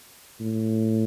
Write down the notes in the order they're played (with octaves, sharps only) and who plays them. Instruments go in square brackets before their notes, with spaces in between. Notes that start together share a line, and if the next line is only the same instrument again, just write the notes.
[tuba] A2